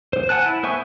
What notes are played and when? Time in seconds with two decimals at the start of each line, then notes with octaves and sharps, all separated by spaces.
0.13 C5
0.29 F#5 G#5 A5 F#6
0.46 E4
0.63 B3 C5 E5 G#5 C#6